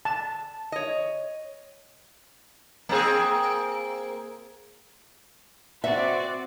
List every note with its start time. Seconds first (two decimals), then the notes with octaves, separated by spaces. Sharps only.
0.05 A5
0.72 C#5 D#5
2.89 A#3 C4 G#4
5.84 C4 F#4 D5 E5